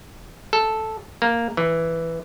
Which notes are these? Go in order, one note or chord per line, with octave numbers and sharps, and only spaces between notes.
A4
A#3
E3